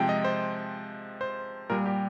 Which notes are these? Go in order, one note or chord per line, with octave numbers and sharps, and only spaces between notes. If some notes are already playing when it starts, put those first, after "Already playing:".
Already playing: C3 F3 G#3 G5
D#5
C5
C5
A#2 G3 A#4
G4